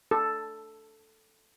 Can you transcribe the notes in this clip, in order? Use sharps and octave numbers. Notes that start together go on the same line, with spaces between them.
A4